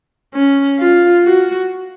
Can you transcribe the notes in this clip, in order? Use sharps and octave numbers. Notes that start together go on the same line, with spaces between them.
C#4
F4
F#4